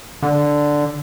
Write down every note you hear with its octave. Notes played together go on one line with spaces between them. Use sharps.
D3